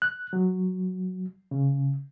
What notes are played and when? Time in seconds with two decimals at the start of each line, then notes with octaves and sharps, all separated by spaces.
0.02 F#6
0.33 F#3
1.51 C#3